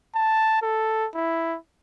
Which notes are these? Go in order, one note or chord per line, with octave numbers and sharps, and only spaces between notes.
A5
A4
E4